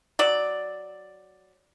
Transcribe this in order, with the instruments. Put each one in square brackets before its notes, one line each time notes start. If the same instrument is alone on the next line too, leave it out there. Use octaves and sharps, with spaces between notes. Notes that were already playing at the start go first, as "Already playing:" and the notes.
[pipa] F#3 D5